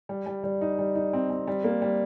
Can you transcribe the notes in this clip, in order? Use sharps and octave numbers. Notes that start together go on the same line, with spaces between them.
G3
G3
G3
D#4
G3
D#4
C4
C4
G3
A#3
G3